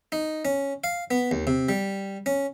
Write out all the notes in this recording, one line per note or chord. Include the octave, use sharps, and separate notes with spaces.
D#4
C#4
F5
B3
D#2
C3
G3
C#4